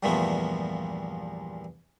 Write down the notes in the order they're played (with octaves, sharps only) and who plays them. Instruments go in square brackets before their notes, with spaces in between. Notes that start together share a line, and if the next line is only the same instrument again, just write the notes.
[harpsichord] E2 G2 A#2 F3 A3 B3